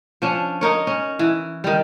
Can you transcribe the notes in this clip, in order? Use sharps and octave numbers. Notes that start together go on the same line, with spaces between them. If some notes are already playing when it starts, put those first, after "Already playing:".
F3 C#4 D4
D#4 A#4 C#5
C#4
E3
D#3 G3